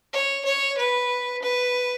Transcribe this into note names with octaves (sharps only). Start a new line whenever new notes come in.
C#5
C#5
B4
B4